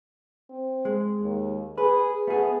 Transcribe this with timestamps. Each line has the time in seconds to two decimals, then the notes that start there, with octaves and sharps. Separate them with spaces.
0.50 C4
0.85 G#3
1.21 D#2
1.78 G#4 B4
2.27 A3 B3 G#4